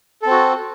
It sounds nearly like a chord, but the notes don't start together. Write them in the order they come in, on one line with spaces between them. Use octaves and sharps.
A4 C4 F#4